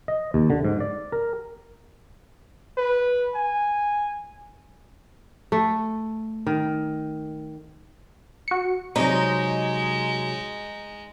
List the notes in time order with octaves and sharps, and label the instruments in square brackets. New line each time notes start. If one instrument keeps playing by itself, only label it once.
[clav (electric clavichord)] D#5
D#2
D3
G#2
D5
A#4
[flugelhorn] B4
G#5
[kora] A3
D#3
[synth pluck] F#4 C#7
[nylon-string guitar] C3 F#3 [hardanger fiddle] G#3 [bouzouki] D#4